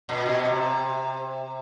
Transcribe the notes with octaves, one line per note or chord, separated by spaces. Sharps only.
A#2
B2
C3